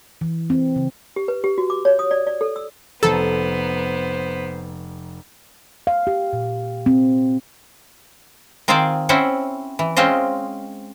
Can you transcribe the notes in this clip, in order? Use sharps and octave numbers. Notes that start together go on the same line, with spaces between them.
E3
C4
C#3
G4
B4
G4
F#4
D6
C#5
D#6
D5
D5
A4
E6
F1 B3 A4 C5 A#5
F5
G4
A#2
C4
D#3 C4 F4 G#4 C5 D5
C4 C#4 E4 C5 F#5
E3
G#3 C4 C#4 F4 C5 D#5